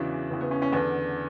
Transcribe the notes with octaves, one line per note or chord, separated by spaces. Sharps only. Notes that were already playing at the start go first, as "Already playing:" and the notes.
Already playing: E2 C#3 E3 D4 F#4
E2 C#3 E3
B3
C#4
C#4
E2 D3 B3 D4